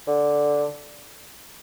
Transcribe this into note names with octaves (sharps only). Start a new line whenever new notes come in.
D3